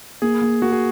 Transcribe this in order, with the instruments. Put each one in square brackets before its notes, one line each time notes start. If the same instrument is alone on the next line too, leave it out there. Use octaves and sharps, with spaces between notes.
[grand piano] A#3 [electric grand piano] G#4
[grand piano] A#3
[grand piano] A#3 [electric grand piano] F#4
[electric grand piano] G#4